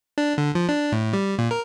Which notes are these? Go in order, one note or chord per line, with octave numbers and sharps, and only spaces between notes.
D4
D3
F3
D4
A2
G3
A#2
A#4